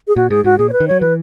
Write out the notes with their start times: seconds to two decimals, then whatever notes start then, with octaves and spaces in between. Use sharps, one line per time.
0.08 G#4
0.16 A#2 F#4
0.30 G#2 G#4
0.44 G#2 F#4
0.58 A#2 G#4
0.69 C#5
0.73 B4
0.80 D#3
0.88 F#3 C#5
1.01 E3 B4